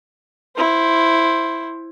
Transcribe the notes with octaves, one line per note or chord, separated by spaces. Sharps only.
E4 C5